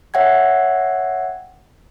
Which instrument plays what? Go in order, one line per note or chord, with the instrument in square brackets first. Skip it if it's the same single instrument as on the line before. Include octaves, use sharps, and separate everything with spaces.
[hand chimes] C#5 E5 F#5 G5 G#6